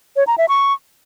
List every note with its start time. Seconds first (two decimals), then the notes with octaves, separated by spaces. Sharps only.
0.16 C#5
0.27 A#5
0.38 E5
0.49 C#6